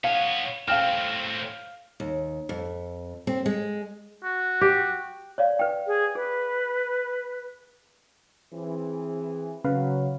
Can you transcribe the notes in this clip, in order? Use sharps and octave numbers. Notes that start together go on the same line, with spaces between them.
B3 C#5 F5
A2 C4 F5 G5 F6
D#2
F2
C4
G#3
F#4
G4
C#5 D5 F5
B4 G5
G#4
G#4 B4
E3 C4 G#4
C#3 F#3 B4 F5